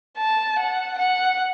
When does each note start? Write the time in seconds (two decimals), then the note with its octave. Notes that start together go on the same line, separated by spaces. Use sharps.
0.18 A5
0.59 F#5
0.98 F#5